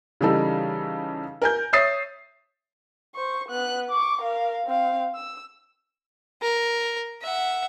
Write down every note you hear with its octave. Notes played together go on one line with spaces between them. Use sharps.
C#3 E3 G3 D#4 A4
A#4 G#5 G6
C#5 E5 D#6 A6 C7
C5 C#6
B3 F#6
C#6 D6
A#4 F5
C4 F5
E6
A#4
E5 F#5